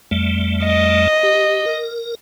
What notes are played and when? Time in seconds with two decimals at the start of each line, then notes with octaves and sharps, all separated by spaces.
0.11 F2 G3 A3
0.65 D#5
1.23 G4
1.66 A#4